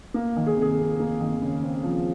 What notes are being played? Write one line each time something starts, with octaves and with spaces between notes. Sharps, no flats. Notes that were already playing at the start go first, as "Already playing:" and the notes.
A#3
D#3
G#4
C3
G#4
F2
A#3
D#3
C#3
C4
F3